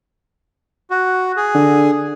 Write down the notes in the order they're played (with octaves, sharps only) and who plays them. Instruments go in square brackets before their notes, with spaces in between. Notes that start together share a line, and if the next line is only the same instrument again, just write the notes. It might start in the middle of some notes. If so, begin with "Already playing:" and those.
[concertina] F#4
G#4
[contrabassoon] D3